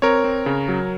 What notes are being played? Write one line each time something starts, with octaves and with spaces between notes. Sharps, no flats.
C4 A#4 C#5
C4
C#3
F#3